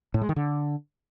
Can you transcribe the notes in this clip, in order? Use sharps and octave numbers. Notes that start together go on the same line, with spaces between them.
A2
G#3
D#3
D3